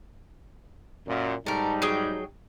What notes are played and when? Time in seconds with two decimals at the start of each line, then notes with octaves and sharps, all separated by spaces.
1.07 F#2 A#2
1.46 G#2 G3 A3 D#4 A#4
1.82 F#3 G#4 G5